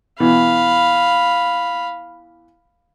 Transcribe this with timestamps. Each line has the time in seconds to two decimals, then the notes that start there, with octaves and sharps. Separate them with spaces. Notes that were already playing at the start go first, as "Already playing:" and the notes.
0.20 B2 E3 F5 B5